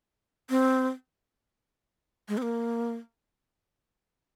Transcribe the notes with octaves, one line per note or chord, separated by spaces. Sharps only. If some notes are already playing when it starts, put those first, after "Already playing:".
C4
G#3
C4
A#3